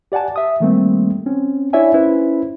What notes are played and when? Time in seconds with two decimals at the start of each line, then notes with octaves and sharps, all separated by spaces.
0.12 G4 D5 F#5 G#5 A5
0.36 E5 D#6
0.60 D#3 G3 A3 A#3 C4
1.26 C4 C#4
1.73 D4 E4 C#5 D5 E5 G#5
1.94 C#4 E4 B4 C5